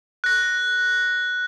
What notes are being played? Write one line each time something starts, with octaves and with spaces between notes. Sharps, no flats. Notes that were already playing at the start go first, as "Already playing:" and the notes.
F#6 A#6